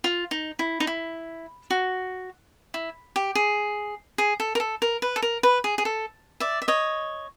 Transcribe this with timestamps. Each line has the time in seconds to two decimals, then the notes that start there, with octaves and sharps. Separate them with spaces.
0.04 F4
0.31 D#4
0.59 E4
0.80 D#4
0.87 E4
1.70 F#4
2.74 E4
3.16 G4
3.35 G#4
4.18 G#4
4.40 A4
4.55 A#4
4.60 A4
4.82 A#4
5.02 B4
5.16 A4
5.22 A#4
5.43 B4
5.64 G#4
5.78 G#4
5.85 A4
6.40 D5 E5
6.62 E5
6.68 C#5 D#5